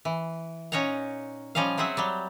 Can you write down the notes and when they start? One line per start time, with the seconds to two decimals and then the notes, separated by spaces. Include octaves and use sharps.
0.05 E3
0.72 A#2 C#4 D#4 C#5 F#5 A#5
1.55 F3 G3 C#4 D#5 F5
1.78 F#3 C4 G#4 E5 F#5
1.97 F#3 G3